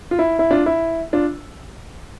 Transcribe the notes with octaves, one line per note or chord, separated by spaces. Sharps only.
F4
E4
E4
D4 F4
E4
D4 F4